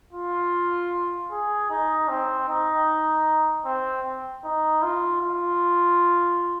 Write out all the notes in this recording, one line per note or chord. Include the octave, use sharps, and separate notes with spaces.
F4
G#4
D#4
C4
D#4
C4
D#4
F4
F4